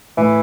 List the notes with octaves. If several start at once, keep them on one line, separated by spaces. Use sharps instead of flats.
A2 E3